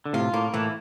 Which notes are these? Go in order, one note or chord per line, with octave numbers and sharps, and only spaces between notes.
D3
A2 C3 F4
A2 A#3
A2 E3